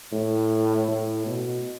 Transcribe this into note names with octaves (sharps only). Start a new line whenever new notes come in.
A2
A2
B2